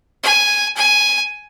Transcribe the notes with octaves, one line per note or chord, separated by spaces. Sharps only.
G#5
G#5